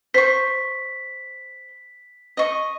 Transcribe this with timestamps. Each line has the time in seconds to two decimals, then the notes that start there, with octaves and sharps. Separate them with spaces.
0.14 C5 C#6 B6
2.37 D#5 C#6